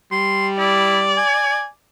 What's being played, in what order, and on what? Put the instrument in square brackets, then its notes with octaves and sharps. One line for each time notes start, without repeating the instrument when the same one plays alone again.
[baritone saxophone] G3 [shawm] C6
[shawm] E4 [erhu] D5
[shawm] G#5